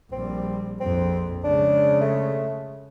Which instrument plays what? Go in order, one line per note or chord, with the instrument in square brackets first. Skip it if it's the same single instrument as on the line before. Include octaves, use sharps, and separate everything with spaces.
[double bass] A#1 G3 [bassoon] C4
[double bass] A#1 F2 [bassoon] C4
[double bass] C#3 G#3 [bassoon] D4
[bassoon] A3